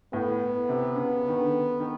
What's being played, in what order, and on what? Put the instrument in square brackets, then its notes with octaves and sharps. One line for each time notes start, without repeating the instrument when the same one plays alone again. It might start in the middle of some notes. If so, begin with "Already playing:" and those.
[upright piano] A2 [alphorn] B3
[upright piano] C3
C#3
D#3
D3
D#3